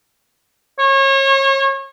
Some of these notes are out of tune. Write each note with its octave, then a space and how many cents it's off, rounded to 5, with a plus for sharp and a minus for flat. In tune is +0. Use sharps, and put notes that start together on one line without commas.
C#5 -35